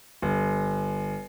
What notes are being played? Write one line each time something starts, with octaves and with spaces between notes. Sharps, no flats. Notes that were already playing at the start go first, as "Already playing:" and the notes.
G1